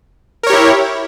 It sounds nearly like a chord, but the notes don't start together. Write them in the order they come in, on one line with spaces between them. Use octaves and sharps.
A#4 C#5 G4 E4